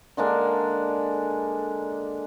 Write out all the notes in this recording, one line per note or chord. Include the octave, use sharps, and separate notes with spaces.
D3 G#3 A#3 D4